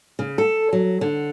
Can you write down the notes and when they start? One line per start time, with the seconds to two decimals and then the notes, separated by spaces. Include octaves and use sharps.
0.19 C#3
0.38 A4
0.73 F#3
1.01 D3